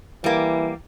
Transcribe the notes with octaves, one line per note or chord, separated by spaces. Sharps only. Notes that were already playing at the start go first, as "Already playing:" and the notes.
E3 G3 A#3